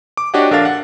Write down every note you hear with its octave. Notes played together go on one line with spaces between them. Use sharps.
D6
D4 F#4 G4 C#5 D#5 F#5
A#1 D4 A4 A#4 F5 A6
F#5